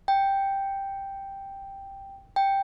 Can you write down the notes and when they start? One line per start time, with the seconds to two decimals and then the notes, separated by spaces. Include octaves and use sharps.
0.08 G5
2.36 G5